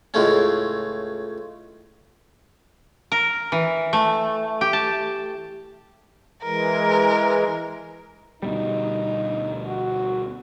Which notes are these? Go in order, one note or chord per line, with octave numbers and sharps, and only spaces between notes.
C#2 A2 G#3 A3 C#4
A#4
E3
A3
G4
A5
E3 G#3 A#4
D2 B2 G3 D#4
F#4